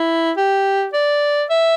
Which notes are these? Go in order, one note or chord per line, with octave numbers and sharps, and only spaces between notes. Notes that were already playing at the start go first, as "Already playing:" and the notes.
Already playing: E4
G4
D5
E5